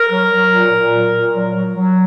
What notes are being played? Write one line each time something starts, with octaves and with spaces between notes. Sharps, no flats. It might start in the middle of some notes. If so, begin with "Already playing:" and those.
Already playing: A#4
F#3
F#3
A#2
A#2
F#3
A#2
F#3
F#3
F#3